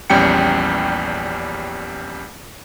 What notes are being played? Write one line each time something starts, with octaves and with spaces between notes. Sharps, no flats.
A#1 E2 G3 C#4 G5 C#7